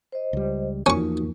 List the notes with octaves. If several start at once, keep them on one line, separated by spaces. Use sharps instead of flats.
C5 D#5
C#2 G3
E2 F3 A#3 C#4 D#4 F#4 C#6